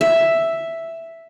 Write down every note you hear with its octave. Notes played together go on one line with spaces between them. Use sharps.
E5